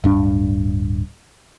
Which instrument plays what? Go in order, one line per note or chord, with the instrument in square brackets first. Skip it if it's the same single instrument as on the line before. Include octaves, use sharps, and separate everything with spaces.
[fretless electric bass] D1 G2 D4